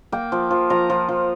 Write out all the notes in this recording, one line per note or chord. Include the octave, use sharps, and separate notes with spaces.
A#3 G5
F3
F3
F3 A#5
F3
F3